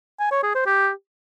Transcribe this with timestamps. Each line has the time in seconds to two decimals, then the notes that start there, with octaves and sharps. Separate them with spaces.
0.19 G#5
0.31 C#5
0.43 G#4
0.55 C5
0.66 G4